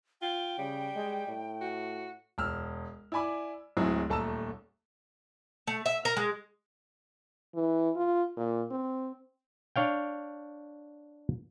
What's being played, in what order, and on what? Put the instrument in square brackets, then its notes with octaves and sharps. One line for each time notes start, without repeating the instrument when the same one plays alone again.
[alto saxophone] F4 [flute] G5
[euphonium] C#3 [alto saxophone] G3
[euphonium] G#3
A2
[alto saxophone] F#4
[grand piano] E1 E6 F6
E4 D5 G#5 B5 D6
D1 F#3 G#3 C4 E4 G#4
D#1 A3 A5 A#5 E6 E7
[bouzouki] A3
E5
A#4
G#3
[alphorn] E3
F4
A#2
C4
[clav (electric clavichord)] D4 C#5 F5 G5